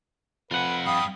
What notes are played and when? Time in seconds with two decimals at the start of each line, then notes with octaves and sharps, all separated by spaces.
0.51 F2 F4 B4 F#5 G#5
0.86 G2 F5 G5 B5 D#6